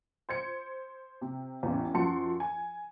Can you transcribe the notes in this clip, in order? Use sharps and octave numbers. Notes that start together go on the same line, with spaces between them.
C5 G#6 C#7
C3
A1 E2
F#2 F3 F#5 A5 C6 C#7
G#5